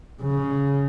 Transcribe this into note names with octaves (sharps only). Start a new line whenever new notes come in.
C#3